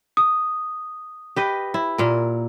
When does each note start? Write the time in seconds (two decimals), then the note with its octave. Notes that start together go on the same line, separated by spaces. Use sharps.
0.17 D#6
1.36 G4 B4 D#5
1.74 E4
1.98 A#2 A#4